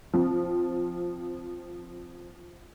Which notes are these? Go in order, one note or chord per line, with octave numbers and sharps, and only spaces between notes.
F3 C4